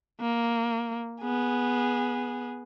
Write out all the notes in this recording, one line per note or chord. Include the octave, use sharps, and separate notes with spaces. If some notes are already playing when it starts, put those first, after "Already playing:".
A#3
B3 G#4